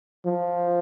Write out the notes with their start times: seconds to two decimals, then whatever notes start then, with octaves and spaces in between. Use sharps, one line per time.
0.26 F3